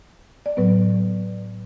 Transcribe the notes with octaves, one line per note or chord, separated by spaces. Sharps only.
D5
A2 F#3 B3 B4